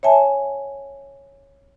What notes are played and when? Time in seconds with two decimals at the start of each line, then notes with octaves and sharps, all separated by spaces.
0.03 C#5 E5 G#5 A5